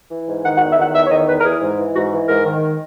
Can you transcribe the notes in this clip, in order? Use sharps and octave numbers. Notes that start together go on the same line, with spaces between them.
E3
G#2
D#3 F#5
F#5
E2
E5
D#3 F#5
E2 E5
C#5
D#3 D#5
E2 B4
A#4
E3 G#4
G#2
E3
G#2 F#4
E3
G#2 A#4
D#3